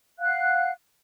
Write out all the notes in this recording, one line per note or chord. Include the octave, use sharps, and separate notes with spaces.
F5 F#5 F#6